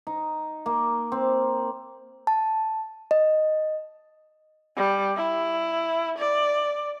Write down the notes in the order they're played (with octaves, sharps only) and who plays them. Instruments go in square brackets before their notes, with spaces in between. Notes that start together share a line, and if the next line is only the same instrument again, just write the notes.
[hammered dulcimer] D#4
A#3
C4
[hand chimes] A5
D#5
[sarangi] G3
E4
D5